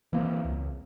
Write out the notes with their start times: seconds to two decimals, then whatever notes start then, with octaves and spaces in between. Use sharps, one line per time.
0.13 E3 A#3 C4
0.45 C#2